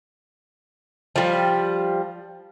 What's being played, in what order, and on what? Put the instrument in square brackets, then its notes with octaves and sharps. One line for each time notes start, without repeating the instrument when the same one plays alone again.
[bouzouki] F3 G3